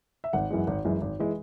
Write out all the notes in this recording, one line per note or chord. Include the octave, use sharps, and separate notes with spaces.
E5
G#1 F#5
F#2 E3 G#3
G#1
F#2 E3 G#3
G#1
E3 G#3